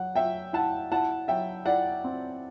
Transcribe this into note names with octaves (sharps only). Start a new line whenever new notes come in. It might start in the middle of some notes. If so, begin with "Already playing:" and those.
Already playing: F#3 F#5
F#3 E5 G5
E4 F#5 A5
E4 F#5 A5
F#3 E5 G5
E4 D5 F#5
C4